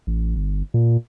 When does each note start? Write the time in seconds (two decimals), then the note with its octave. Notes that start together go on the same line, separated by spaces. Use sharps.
0.07 A1
0.36 G1
0.74 A#2